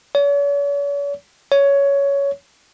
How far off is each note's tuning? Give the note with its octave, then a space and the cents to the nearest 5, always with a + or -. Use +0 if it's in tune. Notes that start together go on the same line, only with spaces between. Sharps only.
C#5 +45
C#5 +15